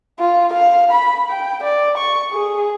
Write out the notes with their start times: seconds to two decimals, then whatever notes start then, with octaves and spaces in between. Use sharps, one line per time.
0.19 F4
0.53 F5
0.91 B5
1.30 G5
1.63 D5
1.97 C#6
2.32 G#4